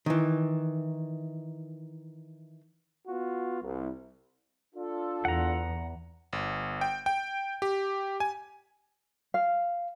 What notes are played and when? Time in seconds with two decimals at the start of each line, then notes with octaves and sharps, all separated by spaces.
0.06 D#3 E3
3.07 B3 F4 F#4
3.62 C2
4.75 D4 F4 A4
5.25 E2 F#5 A#5
6.33 G1
6.81 G5
7.06 G5
7.62 G4
8.20 G#5
9.34 F5